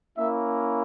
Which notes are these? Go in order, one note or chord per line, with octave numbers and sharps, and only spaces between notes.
A#3 C#4 E4 E5